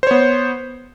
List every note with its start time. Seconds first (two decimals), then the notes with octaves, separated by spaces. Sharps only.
0.03 C5
0.07 C#5
0.11 B3